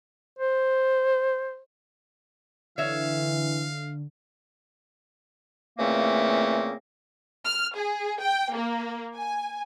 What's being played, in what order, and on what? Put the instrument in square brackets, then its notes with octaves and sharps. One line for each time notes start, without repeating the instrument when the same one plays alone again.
[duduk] C5
[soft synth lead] D3 [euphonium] E3 [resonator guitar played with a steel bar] C#5 E5 [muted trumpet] F5
[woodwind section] A#2 C#3 E3 A3 A#3 C4
[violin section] F6
G#4
G5
A#3
G#5